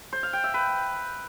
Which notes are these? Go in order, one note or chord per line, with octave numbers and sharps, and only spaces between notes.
C5
F5
G5
E5
B4